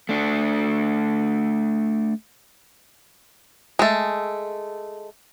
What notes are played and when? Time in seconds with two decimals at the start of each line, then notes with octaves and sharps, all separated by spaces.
0.09 A3 D4
3.79 G#3 A3